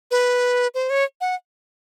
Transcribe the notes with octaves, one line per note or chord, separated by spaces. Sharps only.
B4
C5
C#5
F#5